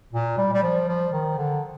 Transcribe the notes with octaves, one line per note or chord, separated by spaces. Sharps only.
A#2
G3
G3
F3
F3
D#3
D3